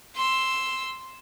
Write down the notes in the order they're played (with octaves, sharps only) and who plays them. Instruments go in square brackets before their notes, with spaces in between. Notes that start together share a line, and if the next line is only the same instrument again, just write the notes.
[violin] C6 E6